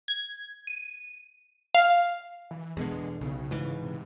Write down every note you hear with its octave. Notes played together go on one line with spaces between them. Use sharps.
G#6
D#7
F5
E3
E2 B2 D3 G#3
B1 C#3
G#2 E3
C3